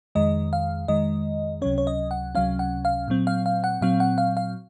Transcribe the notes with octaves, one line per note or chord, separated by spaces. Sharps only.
F2 D#3 G#3 D#5
F5
F2 D#3 G#3 D#5
C#2 C3 F#3 C#4 C#5
C#5
D#5
F#5
C#2 C3 F#3 C#4 F5
F#5
F5
A#2 F#3 C4
F5
F5
F#5
A#2 F#3 C4 F5
F#5
F5
F5